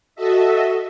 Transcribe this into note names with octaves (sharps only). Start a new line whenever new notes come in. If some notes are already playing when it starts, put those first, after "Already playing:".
F#4 A4 D#5 E5